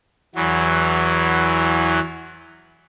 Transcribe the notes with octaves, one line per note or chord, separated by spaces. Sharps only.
E2 E3 F#3